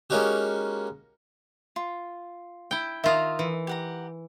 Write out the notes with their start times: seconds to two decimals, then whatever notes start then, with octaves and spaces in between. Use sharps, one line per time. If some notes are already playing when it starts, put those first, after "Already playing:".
0.10 G#3 A#3 C#4 D#4 F#4 G4
1.76 F4
2.71 E4 G5
3.04 D#3 F4 E5 A#5 D#6
3.39 E3
3.67 G4 F#5 A#5